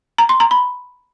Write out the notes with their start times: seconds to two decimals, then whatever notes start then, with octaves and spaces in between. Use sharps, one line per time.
0.18 A#5
0.29 C6
0.40 A#5
0.51 B5